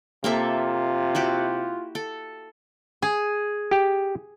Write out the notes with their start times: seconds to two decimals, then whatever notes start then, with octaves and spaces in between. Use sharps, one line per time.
0.24 C3 A#3 F4 A4 E5
1.15 E4 F#4 G4
1.95 A4
3.02 G#4
3.71 G4 G5